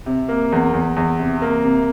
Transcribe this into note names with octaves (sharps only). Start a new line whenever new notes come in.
C3
A#3
E2
E2
E2
C3
A#3
C3